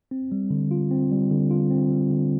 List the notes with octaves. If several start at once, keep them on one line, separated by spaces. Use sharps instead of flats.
C4
G3
D3
F4
C4
G3
D3
F4
C4
G3
D3